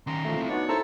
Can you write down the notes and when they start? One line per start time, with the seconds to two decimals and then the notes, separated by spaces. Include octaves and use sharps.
0.07 D#3 C#4 A#5 C6
0.24 F3 A3
0.36 C4 E4
0.49 B3 D4 D#4 F#4 C#5 D5
0.69 E4 A4 C5 A5 A#5 E6